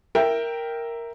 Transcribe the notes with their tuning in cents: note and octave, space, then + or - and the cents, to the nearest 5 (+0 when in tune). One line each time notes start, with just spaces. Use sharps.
A#4 +0 E5 +0 G5 +0